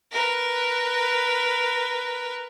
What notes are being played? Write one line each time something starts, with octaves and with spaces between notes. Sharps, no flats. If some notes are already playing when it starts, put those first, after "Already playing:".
A#4 B4